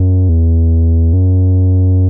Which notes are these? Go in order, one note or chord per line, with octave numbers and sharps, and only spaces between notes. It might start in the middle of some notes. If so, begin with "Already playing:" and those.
Already playing: F#2
E2
F#2